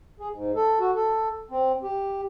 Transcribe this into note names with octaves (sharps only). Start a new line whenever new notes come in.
G#4
G#2
A4
F#4
A4
C4
G4